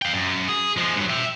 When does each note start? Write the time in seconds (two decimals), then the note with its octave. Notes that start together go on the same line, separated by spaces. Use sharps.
0.02 F5 G5
0.14 F#2
0.48 G#4
0.77 F3 G#3
0.97 G2 F#3
1.10 E5 G5